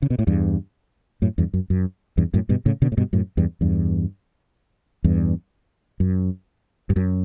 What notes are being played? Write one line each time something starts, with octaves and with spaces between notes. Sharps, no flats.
C#3
B2
A2
E2 G2
F#2 A2
E2 G2
F#2
F#2
E2 G2
F#2 A2
G2 B2
A2 C#3
B2 D3
A2
G2 B2
F#2 A2
E2 G2
E2 G2
E2 G2
F#2
G2
F#2